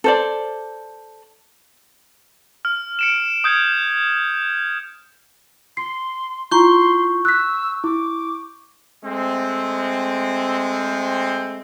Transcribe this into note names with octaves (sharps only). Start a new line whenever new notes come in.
A4 C5 D5
F6
C#7 D7 E7
D#6 G6 G#6 C#7 D7
C6 C7
E4 F4 A#5 C6 C#6 G6
E6 F#6 B6
E4 D6
G#3 A3 C4